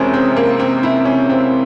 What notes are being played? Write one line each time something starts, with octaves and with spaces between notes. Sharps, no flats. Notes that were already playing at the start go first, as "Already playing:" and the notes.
Already playing: F2 C3 E3 G#3 C#4 G#4 A#4 C5
C4
A#3
C4
E4
C#4
C4